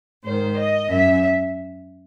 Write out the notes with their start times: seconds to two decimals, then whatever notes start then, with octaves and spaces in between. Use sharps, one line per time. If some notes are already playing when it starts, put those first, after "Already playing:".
0.23 G#2 D#3 C5
0.57 D#5
0.90 F#2 E5